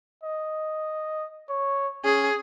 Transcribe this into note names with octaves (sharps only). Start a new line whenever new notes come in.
D#5
C#5
C#4 G#4